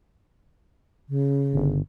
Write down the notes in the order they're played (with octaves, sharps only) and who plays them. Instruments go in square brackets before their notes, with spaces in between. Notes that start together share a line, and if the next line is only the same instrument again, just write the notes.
[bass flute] C#3
[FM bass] G1